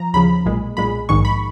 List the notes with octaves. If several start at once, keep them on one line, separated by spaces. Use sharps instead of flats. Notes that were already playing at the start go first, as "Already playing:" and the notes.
Already playing: F3 A#5
D#2 C#3 F3 B5
B1 A#2 G#3
B1 A#2 G#3 B5
A#1 G#2 D#3 G#3 C#6
B5